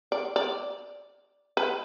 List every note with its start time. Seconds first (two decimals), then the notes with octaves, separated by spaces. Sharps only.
0.12 D5
0.36 D5
1.57 B4